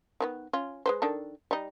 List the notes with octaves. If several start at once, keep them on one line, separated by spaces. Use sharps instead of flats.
D#3 F3 B3
C#4 F4
G#3 B4 C5
D#3 D4 A4
G3 D#4